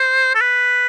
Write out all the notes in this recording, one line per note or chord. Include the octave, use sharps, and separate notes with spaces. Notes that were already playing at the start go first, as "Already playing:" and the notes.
Already playing: C5
A4
B4